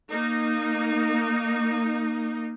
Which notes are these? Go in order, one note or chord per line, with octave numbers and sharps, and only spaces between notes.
A#3 D#4